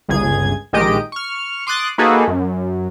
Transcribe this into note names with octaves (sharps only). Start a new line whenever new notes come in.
G1 C#2 G#4 G#6
A#1 D#3 G#3 G4 D#5 D7
C#6 F6
C6 D6 D#6 F#6 A6
A#3 D#4 F#4 G#4 A4 B4
F#2